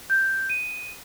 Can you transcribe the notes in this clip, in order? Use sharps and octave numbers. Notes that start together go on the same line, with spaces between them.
G6
D#7